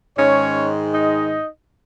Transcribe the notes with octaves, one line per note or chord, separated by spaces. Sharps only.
G#2 D#3 G#3 C#4 C#5
D#4 D#5